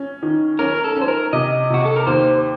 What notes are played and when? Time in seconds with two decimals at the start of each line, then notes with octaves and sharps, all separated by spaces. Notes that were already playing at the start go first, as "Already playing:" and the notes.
Already playing: C#4
0.23 D#3
0.59 C#4 A#4
0.74 A#4
0.84 A4
0.97 C#4 C5
1.08 A#4
1.33 C3 D#5
1.70 C3 F#4
1.85 A4
1.96 A#4
2.07 D#2 C5